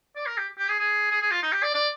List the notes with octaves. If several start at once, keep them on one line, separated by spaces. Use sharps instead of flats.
D5
A#4
G4
G4
G#4
G#4
G#4
G#4
F4
D#4
G4
D5
D5